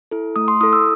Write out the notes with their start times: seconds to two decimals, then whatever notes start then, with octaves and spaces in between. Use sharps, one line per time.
0.11 E4 A4
0.36 A3 D#6
0.48 C6
0.61 E4 A4 D#6
0.73 E6